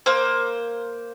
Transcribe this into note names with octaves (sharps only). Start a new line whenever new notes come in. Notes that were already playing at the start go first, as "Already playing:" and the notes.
A#3 C5